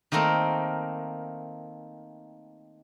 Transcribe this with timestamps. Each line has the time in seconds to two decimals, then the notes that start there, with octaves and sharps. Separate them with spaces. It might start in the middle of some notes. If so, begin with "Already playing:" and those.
0.12 D#3 A3 A#3 C4 A#4